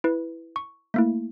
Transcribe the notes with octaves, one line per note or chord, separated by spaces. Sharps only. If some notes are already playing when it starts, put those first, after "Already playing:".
E4 B4
C#6
A3 A#3 E4